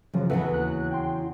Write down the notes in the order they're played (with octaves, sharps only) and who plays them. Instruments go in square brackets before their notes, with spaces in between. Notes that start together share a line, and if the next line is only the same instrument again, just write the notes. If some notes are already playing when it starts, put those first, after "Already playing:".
[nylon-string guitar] F#2 [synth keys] C#3 F3 F#3
[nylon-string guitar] E2 C#3 F#3 [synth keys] A4 B4 F#5
[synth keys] D#2 F#6
G5 C6